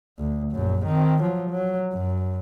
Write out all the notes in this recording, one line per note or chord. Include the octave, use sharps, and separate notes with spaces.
D2
A#1 F#2
D#3 C4
F3 F#3
F#3
F#2